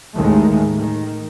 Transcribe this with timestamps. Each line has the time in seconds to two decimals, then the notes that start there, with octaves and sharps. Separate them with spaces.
0.16 A1 D#2 A2 D#3 G#3 A3
0.77 D#3